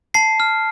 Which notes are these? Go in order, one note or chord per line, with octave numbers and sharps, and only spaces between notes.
A5 C7
F6